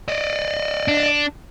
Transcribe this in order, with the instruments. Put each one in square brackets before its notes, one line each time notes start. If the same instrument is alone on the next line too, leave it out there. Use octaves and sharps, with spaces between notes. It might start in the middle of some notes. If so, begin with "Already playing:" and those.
[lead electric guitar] D5 D#5
[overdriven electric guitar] D4